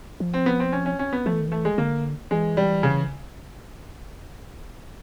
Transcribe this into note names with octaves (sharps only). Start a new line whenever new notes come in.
F3
C4
B3
C4
C#4
C#4
C#4
B3
F3 A3
E3
D#3
E3 A3
G#3
D3 A#3
E3 G#3
G3
C#3